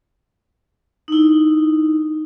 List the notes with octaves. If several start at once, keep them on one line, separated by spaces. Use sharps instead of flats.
D#4 E4